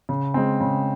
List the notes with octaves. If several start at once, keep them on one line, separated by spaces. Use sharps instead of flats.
C#3
G#3 C4
C#3